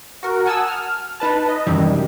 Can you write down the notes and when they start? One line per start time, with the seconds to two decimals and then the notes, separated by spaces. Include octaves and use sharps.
0.23 F#4 A#4
0.46 F#5 G#5 A5 D#6 E6
0.68 F6
1.20 D#4 B4 A5
1.48 D#5
1.67 F#2 C3 D#3 E3 G3